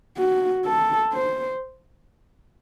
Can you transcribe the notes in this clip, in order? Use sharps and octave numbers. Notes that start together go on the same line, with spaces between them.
F#4
A4
C5